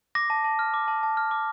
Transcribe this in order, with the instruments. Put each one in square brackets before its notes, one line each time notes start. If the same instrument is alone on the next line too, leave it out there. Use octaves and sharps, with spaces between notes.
[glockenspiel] D6 A#6
A5
A5
F6
D6
A5
A5
F6
D6